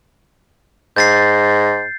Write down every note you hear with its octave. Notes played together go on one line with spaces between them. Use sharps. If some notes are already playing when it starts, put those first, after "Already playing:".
G#2 G6 A6 C7